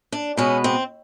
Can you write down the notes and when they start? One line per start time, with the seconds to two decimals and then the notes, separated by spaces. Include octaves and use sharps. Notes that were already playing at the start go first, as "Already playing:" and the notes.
0.12 D4
0.37 B2 G#3 B3 C#4
0.64 C4